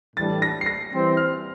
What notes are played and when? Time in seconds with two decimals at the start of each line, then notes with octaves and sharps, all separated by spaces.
0.16 A2 E3 G3 D4 A4 A6
0.42 A#6
0.61 C7
0.66 A#6
0.92 E3 G3 C4
1.17 F6